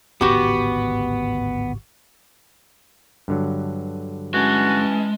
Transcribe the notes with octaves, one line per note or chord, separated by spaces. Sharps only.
D1 G#1 C#3 B3 F#4 G4
G2 D3 F#3
E3 G#3 C#4 F#4 A5